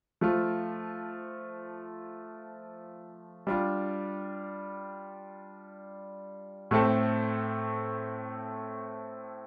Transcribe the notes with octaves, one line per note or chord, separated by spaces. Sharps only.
F3 A3 F4
G3 D4 F4
A2 A3 C4 A4